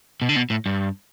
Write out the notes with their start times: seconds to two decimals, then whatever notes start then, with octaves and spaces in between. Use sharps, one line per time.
0.22 B2
0.29 D3
0.36 B2
0.50 A2
0.66 G2